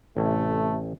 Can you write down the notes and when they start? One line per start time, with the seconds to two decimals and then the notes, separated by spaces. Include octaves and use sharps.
0.17 A1 C3 A3